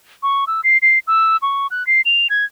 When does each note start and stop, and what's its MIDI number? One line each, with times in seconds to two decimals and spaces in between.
0.23 0.45 85
0.47 0.61 88
0.64 0.78 96
0.82 0.99 96
1.07 1.37 88
1.42 1.67 85
1.71 1.85 90
1.87 2.01 96
2.05 2.27 101
2.30 2.45 92